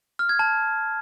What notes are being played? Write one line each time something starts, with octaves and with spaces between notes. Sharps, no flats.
F6
G#6
A5